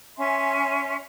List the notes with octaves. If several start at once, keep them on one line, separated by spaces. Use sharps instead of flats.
C#4 E5 G#5 C6